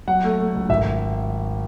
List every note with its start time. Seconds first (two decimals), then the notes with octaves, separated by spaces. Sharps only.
0.08 F#3 F#5
0.24 A3
0.39 A3
0.54 C#2
0.69 G#1 E5